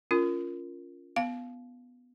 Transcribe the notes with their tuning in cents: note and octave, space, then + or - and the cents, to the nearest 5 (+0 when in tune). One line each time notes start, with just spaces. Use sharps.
C#4 +25 F4 +0 A#4 -5
B3 +0 F5 +0